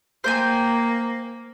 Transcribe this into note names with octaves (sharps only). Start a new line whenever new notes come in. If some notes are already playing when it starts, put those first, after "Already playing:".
A#3 C5 G5 G#5